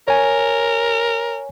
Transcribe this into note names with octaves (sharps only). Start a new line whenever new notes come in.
A#4 C#5 G#5